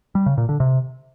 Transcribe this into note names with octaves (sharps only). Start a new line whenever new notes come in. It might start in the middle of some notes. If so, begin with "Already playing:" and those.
G3
C#3
A#2
D3
C3